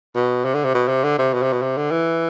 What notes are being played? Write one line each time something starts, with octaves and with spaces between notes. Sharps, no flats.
B2
C3
D3
C3
B2
C3
D3
C3
B2
C3
B2
C3
D3
E3